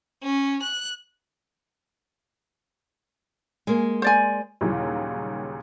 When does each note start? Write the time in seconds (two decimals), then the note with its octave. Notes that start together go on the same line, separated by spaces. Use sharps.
0.23 C#4
0.62 F#6
3.67 G#3 A#3
4.02 C5 D5 G#5
4.61 D#2 A#2 C#3 E3 F#3 G3